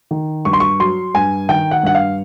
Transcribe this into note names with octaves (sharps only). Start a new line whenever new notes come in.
D#3
G2 C#6
C6
C#6
F#3 C6
G2 G#5
D#3 G5
F#5
G2 F#5
F5